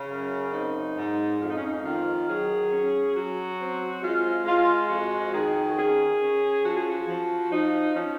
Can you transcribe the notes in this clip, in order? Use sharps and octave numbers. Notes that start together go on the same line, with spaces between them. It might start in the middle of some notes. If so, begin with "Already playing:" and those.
Already playing: C#3 C#4
F#2
C4 D#4
G#2
F2 F4
D#4
C#4
D#4
D#3 F4
F#3 G#4
C#4
F#3 F#4
C4
G#3 F4
G#3 F4
F2 F#4
D#3 G#4
F#4
C#4 G#4
C#4
F3 F#4
G#4
F#4
F3
F3 D#4
F3 C#4